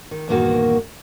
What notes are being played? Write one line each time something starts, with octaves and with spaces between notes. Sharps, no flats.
D#3
E2 G2 A#2 D#3 A#3 F#4